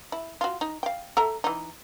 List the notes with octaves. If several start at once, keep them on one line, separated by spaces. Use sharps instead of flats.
E4
F4 F#4
D#4
F5 G5
A4 E5 A#5
E3 D#4